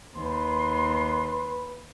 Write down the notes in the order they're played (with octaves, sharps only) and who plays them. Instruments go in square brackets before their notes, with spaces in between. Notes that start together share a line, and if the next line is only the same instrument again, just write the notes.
[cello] D#2 [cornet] B4 [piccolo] C6